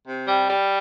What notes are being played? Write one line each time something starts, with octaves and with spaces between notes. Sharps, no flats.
C3
G3
G3